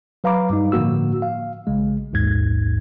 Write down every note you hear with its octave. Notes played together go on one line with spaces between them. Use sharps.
F#3 B4 F5 A#5 B5 D6
G2 G3 D#4
A2 D3 F3 A#3 F#4 E6
F5
A#1 C#3 G#3
A#1 D#2 G#2 G#6